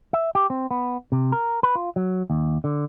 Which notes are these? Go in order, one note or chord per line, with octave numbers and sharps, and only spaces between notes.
E5
G4
C4
B3
C3
A#4
B4
F4
F#3
D#2
D3